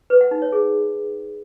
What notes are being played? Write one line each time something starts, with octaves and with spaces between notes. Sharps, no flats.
B4
F#5
D#4
C#5
G#4